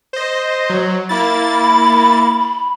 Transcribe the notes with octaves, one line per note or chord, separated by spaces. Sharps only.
C5 D#5
F#3
A#3 E4 B5 A6
B5